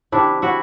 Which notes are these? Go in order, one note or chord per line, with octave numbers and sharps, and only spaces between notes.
C3 D#3 G3 D4 E4
E4 F#4